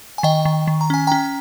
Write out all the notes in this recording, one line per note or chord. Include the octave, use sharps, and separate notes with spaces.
G#5
D#3 D#5 G5
D#3
D#3
A#5
C#4 G#5
C#4 G5 A#5